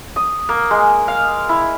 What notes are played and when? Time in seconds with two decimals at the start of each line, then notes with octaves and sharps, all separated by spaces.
0.16 D#6
0.49 A#3
0.71 G#3
1.08 F5
1.49 E4